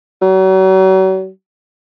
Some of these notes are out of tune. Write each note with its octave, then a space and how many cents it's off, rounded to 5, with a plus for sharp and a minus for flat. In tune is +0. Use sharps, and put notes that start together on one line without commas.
F#3 +40